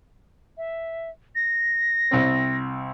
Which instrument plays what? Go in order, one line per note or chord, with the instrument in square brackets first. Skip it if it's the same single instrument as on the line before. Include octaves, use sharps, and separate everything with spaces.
[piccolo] E5
A#6
[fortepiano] C2 C4